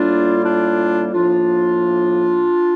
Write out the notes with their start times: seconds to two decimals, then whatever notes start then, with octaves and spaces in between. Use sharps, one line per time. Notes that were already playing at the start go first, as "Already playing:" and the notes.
Already playing: A2 G3 A#3 D4 F4
0.44 D4 F4
1.12 A2 F3 A#3 D4 F4